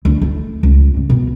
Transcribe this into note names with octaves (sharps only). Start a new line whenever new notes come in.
D2
A3
C#2
C#2
B2